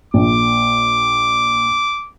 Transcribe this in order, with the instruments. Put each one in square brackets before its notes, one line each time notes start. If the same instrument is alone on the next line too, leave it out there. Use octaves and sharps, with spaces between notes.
[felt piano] A#1 [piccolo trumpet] D6